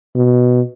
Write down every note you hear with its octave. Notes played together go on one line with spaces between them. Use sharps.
B2